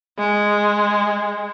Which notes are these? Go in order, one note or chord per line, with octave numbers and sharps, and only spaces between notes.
G#3